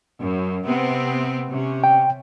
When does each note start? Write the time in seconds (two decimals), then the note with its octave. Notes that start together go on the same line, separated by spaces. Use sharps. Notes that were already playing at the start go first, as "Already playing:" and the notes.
0.21 F#2
0.66 C3 B3 C4
1.51 C3 C#4
1.84 G5